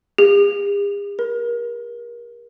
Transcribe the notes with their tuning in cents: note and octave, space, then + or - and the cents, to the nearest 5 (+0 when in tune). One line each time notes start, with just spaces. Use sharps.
G#4 -45
A#4 +30